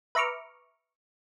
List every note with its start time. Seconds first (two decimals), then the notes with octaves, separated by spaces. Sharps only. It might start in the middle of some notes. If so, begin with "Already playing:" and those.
0.15 B4 E5 A#5 C#6 D6 F6